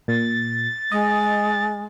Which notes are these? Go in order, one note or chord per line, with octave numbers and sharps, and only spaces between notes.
A#2 A6
G#3 D#5